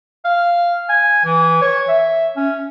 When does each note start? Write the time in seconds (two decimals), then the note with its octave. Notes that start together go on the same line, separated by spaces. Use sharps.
0.25 F5
0.89 G#5
1.24 E3
1.61 C#5
1.88 E5
2.36 C#4